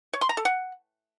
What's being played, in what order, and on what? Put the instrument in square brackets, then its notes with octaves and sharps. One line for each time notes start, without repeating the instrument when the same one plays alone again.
[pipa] C#5
C6
A#5
A4
F#5